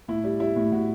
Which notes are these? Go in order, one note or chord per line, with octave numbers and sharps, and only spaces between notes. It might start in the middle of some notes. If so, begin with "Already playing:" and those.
A2 E4
G3
G3 E4
A2
A2 F#4